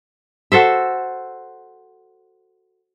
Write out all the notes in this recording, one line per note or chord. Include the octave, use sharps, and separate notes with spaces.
F#4 A4 C5 E5